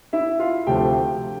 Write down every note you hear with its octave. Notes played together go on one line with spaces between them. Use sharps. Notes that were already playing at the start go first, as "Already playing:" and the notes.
E4 E5
F4 F5
D2 C3 F3 A3 G4 G5